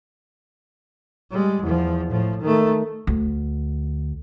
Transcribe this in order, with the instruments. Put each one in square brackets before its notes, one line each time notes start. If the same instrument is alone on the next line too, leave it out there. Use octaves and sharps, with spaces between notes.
[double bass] G3 G#3
E2 F3
A2 F3
D#3 A3
[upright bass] D2